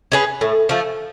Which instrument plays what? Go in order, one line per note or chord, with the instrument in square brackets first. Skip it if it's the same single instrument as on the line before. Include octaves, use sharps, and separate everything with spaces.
[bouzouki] C#4 G#4 B4
A2
F3 A3